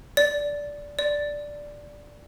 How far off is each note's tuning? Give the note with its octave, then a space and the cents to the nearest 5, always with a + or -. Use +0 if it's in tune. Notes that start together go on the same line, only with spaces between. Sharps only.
D5 -10
D5 +0